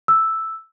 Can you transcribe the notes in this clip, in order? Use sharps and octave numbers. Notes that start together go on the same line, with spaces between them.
E6